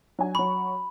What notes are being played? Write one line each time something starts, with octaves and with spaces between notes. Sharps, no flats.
F#3 D4 G#5
F#3 B5 C#6